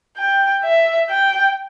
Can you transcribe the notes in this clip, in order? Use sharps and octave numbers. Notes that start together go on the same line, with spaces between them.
G5
E5
G5